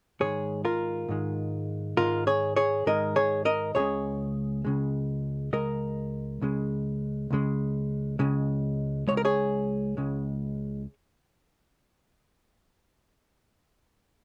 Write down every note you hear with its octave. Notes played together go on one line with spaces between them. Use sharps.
G#2 D#3 G#3 G#4 C#5
F4 A#4
G#2 D#3 G#3
G#2 D#3 G#3 F4 A#4
G#4 C#5
G#4 C#5
G#2 D#3 G#3 A#4 D#5
G#4 C#5
A#4 D#5
C#2 C#3 G#3 G#4 C#5
C#2 C#3 G#3
C#2 C#3 G#3 A#4 D#5
C#2 C#3 G#3
C#2 C#3 G#3
C#2 C#3 G#3
C#2 C#3 G#3 C#5
A#4
G#4 C#5
C#2 C#3 G#3